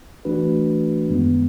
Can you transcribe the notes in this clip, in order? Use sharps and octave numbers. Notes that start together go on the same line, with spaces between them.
E3 A3 D4 F#4 B4
F#2 D#3 G#3 B3